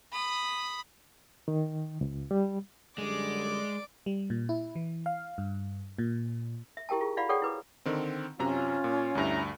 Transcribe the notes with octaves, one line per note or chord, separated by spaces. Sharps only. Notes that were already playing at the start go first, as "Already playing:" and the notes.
B5 D#6
D#3
C#2
G3
F#2 D3 G3 G#3 D5 D6
G3
A#2
E4
E3
F5
G2
A#2
E5
E4 G4 A#4 G5 A5
F4 G#4
E4 F#4 D5 F5 F#5 B5
G#4 A4 C#5 D5 F#5 G5
E4 B4 D6
D3 D#3 C4
F#2 C3 C#4 F4 A#5
A#2
D2 G2 E4 A#5